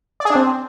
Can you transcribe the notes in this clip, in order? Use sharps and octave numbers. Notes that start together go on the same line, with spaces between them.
D5
G#4
D4
C4